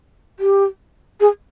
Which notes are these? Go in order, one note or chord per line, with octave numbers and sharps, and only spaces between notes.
G4
G#4